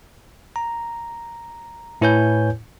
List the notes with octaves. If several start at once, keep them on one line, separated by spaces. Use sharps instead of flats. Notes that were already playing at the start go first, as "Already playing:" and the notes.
A#5
A2 E4 B4 C#5 G#5 G6